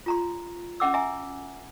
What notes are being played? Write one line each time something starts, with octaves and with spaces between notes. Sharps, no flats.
F4 A#5 C6
C#4 E5 F#5 D6 E6
E5 G#5 A#5 C6